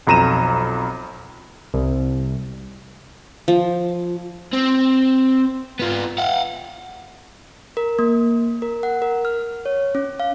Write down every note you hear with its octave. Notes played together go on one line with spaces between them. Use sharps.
B1 F2 A#5 D#7 E7
C2
F3
C4
B3 F4
F5 F#5
A#4
A#3
A#4
F#5
A#4
F6
C#5
C#4
F5